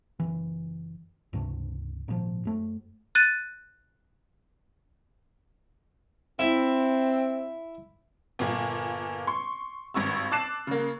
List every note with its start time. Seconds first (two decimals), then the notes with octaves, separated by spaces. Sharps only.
0.20 F#1 C2 E3
1.33 C#2 G2 C3 D4
2.08 G#1 A#2 D3 F3
2.45 F#2 A3
3.15 F#6 A6 D#7
6.39 C4 E4
8.39 G1 A#2
9.27 C6 C#6
9.94 G#1 G2 C#6 E6
10.31 A5 D6 F#6 A6 C7 E7
10.67 C#3 A#3